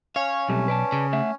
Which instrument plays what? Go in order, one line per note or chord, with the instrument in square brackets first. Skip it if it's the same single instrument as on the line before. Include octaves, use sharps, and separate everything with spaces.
[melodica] C#4 [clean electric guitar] C#5 [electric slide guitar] F5
[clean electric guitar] B1 [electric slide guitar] C3 G3 A3
[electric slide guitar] B4 D5 A5
[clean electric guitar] C#3
[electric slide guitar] A3 E5 F#5